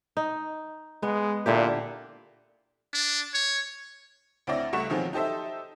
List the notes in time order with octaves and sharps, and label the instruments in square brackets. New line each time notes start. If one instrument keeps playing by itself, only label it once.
[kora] D#4
[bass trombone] G#3 [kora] B3
[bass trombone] A#2 [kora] D3 E4 G4
[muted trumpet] D4
C#5
[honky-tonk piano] D2 C4 E4 D5 A#6
C#2 G3 A3 F#5 C#6 E7
B2 D#3 F3 F#3 G#3 C4
D#4 G4 A4 C5 E5